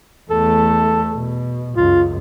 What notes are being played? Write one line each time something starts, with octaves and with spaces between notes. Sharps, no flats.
E2 A3 A4
B2
C#2 F#2 F4